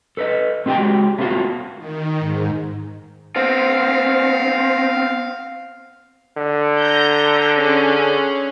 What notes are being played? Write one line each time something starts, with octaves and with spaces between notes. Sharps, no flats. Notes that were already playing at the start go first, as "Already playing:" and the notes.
A4 B4 C#5 D#5
C4 D#4 G4 F#5 G5
G#3 F#4 G4
A3 B3 C4 D#4 F4 F#4
D#3
G#2
B3 C4 F5
D3
A#5 G6
C#4 G#4